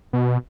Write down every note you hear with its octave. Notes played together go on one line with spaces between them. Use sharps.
B2